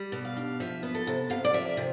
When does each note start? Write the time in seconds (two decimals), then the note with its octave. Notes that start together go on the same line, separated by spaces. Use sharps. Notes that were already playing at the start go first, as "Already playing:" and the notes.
Already playing: G3
0.12 B2
0.25 F5
0.37 D4
0.60 F3 E5
0.83 B3
0.95 A4
1.07 C3
1.30 C3 F5
1.45 D5
1.53 F3 E5
1.77 C3